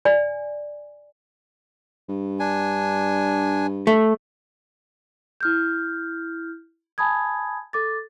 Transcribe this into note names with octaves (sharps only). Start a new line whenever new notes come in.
D5 G#5
G2
D4 G#5
A3
E4 F6 G6
G#5 A5 B5 D#6 G#6
A4 D6 A6